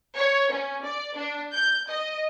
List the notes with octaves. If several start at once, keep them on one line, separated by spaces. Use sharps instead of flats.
C#5
C#4
D5
D4
G6
D#5